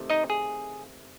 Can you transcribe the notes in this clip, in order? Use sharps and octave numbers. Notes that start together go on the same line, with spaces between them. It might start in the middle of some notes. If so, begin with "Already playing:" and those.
Already playing: C3 D#3 A3
D#4 D#5
G#4